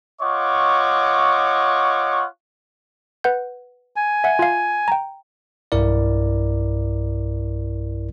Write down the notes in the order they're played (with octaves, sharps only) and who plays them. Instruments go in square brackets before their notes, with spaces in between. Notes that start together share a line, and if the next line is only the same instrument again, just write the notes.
[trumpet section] F4 C#5 D#5 F#5 C#6 D6
[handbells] B4 F#5 G6
[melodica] G#5
[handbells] E5 F#5
F4 F5
G5 A#5
[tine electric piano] B1 G2 E4 A#4 D5